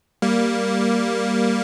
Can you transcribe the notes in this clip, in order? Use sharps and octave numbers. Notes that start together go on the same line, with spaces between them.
G3 A#3